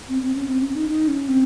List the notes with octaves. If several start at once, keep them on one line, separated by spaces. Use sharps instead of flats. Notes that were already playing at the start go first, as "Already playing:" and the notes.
C4
C4
C#4
C4
C#4
D#4
D#4
C#4
C4